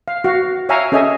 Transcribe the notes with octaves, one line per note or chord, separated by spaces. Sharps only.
F5
F#4 F5
C#5 E5 F5 G5 G#5 A#5
C#4 G#4 A4 D#5 E5 G#5